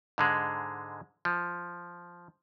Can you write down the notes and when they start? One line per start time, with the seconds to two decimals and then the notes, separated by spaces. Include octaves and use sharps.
0.18 G#2 D3 G#3
1.25 F3